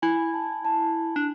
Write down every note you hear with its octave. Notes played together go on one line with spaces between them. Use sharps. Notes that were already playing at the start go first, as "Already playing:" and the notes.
E4 G#5
A5
A5
D4